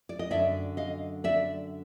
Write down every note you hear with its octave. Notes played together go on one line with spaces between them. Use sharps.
D5
D#5
F#2 D3 D5 E5
D#5 F5
D5 E5